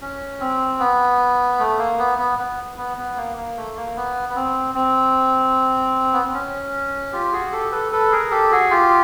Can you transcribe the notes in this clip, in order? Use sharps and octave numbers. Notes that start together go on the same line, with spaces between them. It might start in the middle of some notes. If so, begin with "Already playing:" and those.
C#4
C4
B3
A3
A#3
B3
B3
B3
B3
B3
A#3
A#3
A3
A#3
B3
B3
C4
C4
B3
C4
C#4
F4 G4
F#4 G#4
G4 A4
A4 B4
A4 B4
G#4 A#4
G4 A4
F#4 G#4
F4 G4